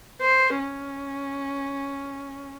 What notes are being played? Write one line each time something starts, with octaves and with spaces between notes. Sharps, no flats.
C5
C#4